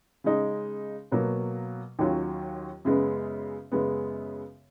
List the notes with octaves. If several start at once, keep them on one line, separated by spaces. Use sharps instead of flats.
C#3 G#3 D#4
B2 F#3 A#3
D#2 D#3 F#3 C#4 F4
F#2 C#3 G#3 B3
F#2 C#3 G#3 B3